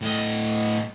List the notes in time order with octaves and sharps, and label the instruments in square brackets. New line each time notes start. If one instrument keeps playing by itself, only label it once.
[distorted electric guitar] A2 D#5